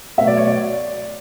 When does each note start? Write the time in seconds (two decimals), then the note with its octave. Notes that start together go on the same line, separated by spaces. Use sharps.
0.17 B2 F#3 A3 E5
0.27 D5
0.37 C#5
0.47 D5